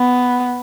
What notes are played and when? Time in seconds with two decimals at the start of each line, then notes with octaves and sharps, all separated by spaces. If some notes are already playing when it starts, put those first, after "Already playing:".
Already playing: B3